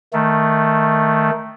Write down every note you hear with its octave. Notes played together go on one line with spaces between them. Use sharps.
D#3 A3